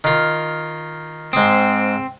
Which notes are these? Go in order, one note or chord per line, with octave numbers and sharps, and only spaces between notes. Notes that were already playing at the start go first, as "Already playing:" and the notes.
D#3 F4
G#2 C4 D#6